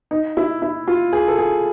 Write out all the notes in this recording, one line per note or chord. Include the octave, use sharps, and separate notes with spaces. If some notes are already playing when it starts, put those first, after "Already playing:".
D#4
E4
E4
F4
G#4
A4
G#4